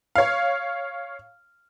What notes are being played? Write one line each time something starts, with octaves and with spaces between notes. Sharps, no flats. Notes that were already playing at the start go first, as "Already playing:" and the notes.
C#5 F5